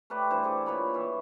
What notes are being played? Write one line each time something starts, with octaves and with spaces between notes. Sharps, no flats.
A3 G4 B4 D5
G2 E3 E4 C5
G#4 A4 D5
A#2 B4 C#5 B5
E3 E5